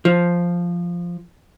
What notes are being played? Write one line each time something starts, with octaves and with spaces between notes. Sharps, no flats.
F3